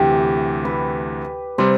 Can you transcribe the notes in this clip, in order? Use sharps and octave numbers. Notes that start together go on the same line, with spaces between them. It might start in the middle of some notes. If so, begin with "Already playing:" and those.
Already playing: D2 C3 E3 G4
B4
C3 G3 C5